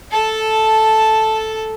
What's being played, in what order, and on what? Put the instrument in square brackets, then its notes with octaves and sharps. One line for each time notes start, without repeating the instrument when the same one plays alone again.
[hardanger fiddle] A4 A5